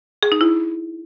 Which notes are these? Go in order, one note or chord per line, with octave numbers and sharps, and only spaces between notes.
G#4
D#4
E4